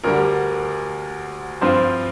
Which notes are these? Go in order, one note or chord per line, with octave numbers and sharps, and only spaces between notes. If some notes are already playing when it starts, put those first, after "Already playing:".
D2 D3 G3 A#4
G2 F3 C4 F4 C5